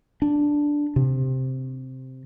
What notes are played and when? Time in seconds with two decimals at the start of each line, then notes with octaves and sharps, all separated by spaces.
0.22 D4
0.96 C3